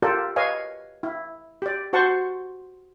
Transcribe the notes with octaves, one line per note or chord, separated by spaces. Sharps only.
F4 G4 A4 A#4 D5
B4 C#5 D#5 F5 G#5
E4
G4 D5
F#4 C5 F#5 A5 C6 C#6